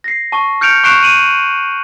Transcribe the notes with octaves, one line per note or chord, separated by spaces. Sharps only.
A#6 C7
A5 C#6
F6 G6 C#7 D7 F7
C#6 F#6 C7 D7 E7 F7
D#7 F#7